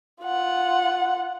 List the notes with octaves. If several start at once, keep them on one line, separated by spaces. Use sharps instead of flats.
F4 F#5